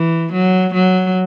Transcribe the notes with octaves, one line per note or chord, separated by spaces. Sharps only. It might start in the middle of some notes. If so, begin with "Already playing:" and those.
Already playing: E3
F#3
F#3